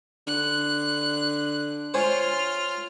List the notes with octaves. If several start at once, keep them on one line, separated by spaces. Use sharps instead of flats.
D3 F#6
F4 C5 C#5 G#5 F6